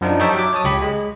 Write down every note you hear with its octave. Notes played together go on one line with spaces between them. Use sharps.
F#2 F3 D4 D#4
D#4 G4 C#5 E5 G5 A5
F#3 D6
C#5 A5 D#6
C#2 G4 B5
G#3